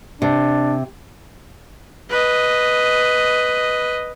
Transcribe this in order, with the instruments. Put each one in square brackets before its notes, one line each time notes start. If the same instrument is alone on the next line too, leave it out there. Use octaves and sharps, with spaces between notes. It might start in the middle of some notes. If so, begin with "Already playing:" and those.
[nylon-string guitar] C3 [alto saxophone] D4
[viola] B4 D#5